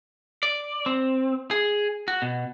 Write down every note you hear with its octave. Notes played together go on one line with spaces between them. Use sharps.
D5
C4
G#4
F#4
B2